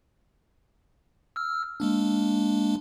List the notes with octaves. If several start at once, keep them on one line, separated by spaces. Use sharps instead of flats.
E6 F6
G#3 A#3 D4